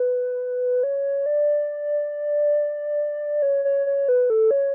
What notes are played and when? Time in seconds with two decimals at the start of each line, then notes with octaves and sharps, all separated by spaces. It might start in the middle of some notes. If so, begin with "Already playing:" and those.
Already playing: B4
0.83 C#5
1.26 D5
3.42 C#5
3.65 C#5
3.86 C#5
4.09 B4
4.30 A4
4.51 C#5